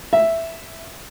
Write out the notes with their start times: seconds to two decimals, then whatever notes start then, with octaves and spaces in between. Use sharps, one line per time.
0.13 E5